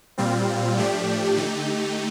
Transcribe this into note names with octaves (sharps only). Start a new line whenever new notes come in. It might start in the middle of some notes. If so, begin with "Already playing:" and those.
A#2 G3 C4 F4
A2 F3 A3 D4 G4
D3 A3 D#4 G4